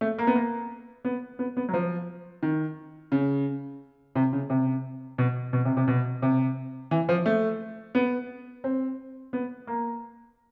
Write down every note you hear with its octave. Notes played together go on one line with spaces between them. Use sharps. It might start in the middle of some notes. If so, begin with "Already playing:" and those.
A3
A#3
B3
A#3
B3
B3
B3
F#3
F3
D#3
C#3
C3
C#3
C3
B2
B2
C3
C3
B2
C3
E3
F3
A3
B3
C4
B3
A#3